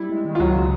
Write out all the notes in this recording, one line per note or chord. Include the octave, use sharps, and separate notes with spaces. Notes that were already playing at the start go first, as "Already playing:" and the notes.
Already playing: G3 E4
G#3
D#3
F4
C#2 F#3 F#4
C#3